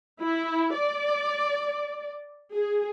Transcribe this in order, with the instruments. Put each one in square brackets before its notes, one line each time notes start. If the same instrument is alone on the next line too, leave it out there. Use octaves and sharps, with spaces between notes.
[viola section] E4
D5
G#4